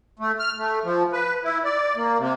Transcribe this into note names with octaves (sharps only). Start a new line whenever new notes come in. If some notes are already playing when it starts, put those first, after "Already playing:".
A3
F6
A3
F3
B4
E4
D5
A#3
C3